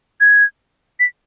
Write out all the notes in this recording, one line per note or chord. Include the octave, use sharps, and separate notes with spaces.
G#6
B6